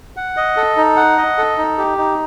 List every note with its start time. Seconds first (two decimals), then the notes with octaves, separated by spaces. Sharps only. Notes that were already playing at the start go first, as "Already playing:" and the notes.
0.16 F#5
0.37 D#5
0.57 A4
0.77 D#4
0.97 F#5
1.18 D#5
1.38 A4
1.58 D#4
1.78 G4
1.98 D#4